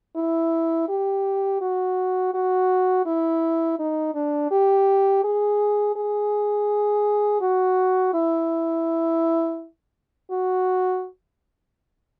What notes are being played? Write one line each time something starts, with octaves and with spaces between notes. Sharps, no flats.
E4
G4
F#4
F#4
E4
D#4
D4
G4
G#4
G#4
F#4
E4
F#4